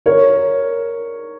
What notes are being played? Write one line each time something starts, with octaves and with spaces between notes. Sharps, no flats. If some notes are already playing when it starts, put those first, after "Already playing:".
A#4 C#5